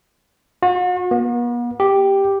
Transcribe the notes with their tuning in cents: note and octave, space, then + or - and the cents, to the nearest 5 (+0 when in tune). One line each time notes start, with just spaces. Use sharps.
F#4 -45
B3 -45
G4 +0